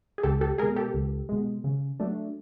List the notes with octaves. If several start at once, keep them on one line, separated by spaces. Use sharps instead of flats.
G#4
C#2 G4 A4
G4 A4
B2 G#3 G#4 A#4
G4 A4
C#2
B2 G#3
C#3
F#3 A3 D4